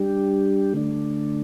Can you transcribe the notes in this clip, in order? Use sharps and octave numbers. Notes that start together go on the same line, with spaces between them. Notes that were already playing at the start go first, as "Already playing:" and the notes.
Already playing: G3 D4 G4
D3 A3 D4